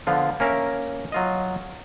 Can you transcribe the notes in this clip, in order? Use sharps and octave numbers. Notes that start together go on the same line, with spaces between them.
D3 F3 B3 F4
A#3 C#4 A#4 E5
F#3 F4 D#5